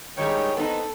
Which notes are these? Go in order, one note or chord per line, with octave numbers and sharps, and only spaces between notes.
D#3 G3 G#3 D#4 C#5 G5
B3 C4 D#4 A4